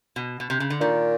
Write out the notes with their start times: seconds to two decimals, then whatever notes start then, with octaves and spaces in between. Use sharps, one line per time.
0.16 B2
0.40 B2
0.50 C3
0.60 C#3
0.70 D3
0.80 A#2 D#3